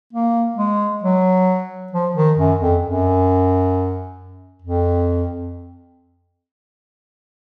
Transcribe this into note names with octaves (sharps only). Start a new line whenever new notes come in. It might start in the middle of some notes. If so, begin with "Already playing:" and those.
A#3
G#3
F#3
F3
D#3
F#2
F2
F#2
F2